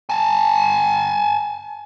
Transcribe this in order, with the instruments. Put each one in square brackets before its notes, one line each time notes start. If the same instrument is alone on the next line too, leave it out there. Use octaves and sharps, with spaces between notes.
[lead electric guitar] G#5 A5